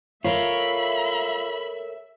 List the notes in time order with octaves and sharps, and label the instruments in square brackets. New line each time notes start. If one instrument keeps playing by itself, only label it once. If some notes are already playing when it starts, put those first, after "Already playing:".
[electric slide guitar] F4 [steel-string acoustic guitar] A4 A#4 C#5 [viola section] E5 [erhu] B5